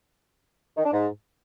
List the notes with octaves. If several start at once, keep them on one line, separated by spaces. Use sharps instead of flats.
D#3
D4
G#2